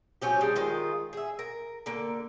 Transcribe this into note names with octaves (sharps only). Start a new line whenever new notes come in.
F3 F#3 C#4 G4
G3 G#3 D4
D#3 G#3 F4
G#4 E5
A#4
D3 A#3